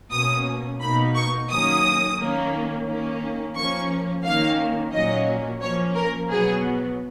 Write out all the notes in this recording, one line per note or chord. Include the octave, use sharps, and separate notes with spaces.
B2 A#3 C#4 D#6
B2 A#3 D#4 B5
C#6
D#3 F#3 A#3 C#4 D#6
D#3 A#3 C#4
D#3 A#3 C#4
F3 A#3 C#4 C#6
D#3 A#3 C#4 F5
A#2 F#3 A#3 C#4 D#5
F3 A#3 C#4 C#5
A#4
B2 F#3 B3 G#4